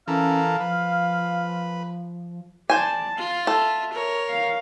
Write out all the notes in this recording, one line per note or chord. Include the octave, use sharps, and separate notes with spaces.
E3 C#4 A4 A#4 F5
F3 B4
C5 D5 G#5 A5
F4 F5
A4 E5
A#4 C#5
F5